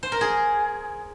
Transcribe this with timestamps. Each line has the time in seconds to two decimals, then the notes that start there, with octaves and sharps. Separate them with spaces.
0.03 C5
0.12 A#4
0.21 G#4